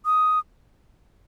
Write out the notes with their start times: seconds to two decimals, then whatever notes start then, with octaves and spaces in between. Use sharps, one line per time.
0.05 D#6